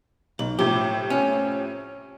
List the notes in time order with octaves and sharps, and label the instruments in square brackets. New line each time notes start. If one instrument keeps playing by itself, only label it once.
[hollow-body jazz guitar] B1 [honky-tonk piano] F#7
[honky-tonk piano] A2 C3 F3 [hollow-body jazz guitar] G4
[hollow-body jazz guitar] C#4